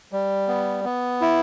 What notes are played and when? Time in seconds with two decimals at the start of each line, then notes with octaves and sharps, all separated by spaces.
0.12 G3
0.48 B3
0.85 B3
1.21 E4